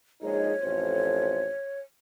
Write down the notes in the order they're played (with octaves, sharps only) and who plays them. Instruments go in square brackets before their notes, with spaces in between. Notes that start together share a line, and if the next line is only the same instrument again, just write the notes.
[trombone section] A#1 G#3 D#4 [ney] C#5
[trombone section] A1 F2 C5